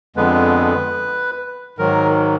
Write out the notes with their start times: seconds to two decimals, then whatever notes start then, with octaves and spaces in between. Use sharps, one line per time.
0.16 F2 D3 G#3 B3 B4
1.78 G#2 D#3 F#3 A#4